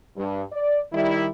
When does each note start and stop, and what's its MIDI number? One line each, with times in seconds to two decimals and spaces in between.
0.17 0.43 43
0.51 0.81 74
0.93 1.27 51
0.93 1.27 55
0.93 1.27 64